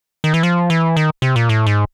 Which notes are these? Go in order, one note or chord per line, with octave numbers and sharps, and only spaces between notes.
D#3
E3
F3
E3
D#3
C3
A#2
A2
G#2